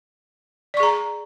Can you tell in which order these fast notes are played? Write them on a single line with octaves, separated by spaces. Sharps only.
D5 C#6 G#4 A#5